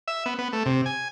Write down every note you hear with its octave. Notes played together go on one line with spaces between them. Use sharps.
E5
B3
B3
A3
C3
G#5